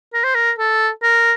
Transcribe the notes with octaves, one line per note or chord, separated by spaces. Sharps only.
A#4
C5
A#4
A4
A#4